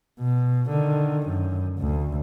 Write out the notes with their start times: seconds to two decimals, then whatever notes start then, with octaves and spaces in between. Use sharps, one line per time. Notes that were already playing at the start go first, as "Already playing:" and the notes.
0.20 B2
0.69 D3 D#3
1.27 F#2
1.78 D2